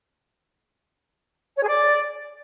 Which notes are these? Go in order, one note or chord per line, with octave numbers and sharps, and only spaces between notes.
C#5
G#4
D5